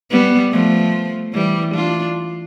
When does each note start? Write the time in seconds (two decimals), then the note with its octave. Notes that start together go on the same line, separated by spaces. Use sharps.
0.11 G3 B3
0.52 F3 A3
1.33 E3 G3
1.74 D4 F4